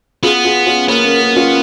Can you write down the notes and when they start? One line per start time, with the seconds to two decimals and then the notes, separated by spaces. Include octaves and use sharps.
0.23 B3 F4 G#4
0.45 F4 G#4
0.66 C#4 F4
0.88 A#3 B3 C#4
1.04 A#3
1.21 A#3
1.36 C#4 F4